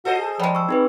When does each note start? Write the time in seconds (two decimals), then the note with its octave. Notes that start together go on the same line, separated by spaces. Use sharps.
0.05 F#4 A4 C5 D#5
0.18 G#4
0.40 F3 G3 G#3
0.55 C#6 E6
0.69 C4 D#4 G#4 B4